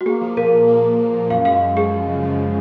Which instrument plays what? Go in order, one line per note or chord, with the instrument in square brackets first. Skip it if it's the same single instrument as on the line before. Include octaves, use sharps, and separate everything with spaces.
[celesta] F#4
[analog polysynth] A#3 [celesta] G#4
[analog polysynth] F3
[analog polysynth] A#2 [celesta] A#4
[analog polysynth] F3
A#3
A#2
F3
A#2
[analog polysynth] F#2 [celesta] F5
[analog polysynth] G#3 [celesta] F5
[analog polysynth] F#2
[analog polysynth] F3 [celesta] G#4
[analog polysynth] F3
C#3
F3
F3